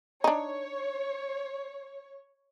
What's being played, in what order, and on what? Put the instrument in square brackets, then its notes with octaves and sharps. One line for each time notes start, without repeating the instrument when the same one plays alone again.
[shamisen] D4 D#4 [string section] C#5